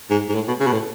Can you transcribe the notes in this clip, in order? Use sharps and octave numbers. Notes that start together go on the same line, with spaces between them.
G#2
G#2
A2
B2
C#3
B2
A2